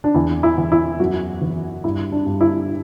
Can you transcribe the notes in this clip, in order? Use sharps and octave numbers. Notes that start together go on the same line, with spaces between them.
D4
E2 E4
E4
E2
E4
F#2 F#4
E3
G2 E4
D4
G2
E4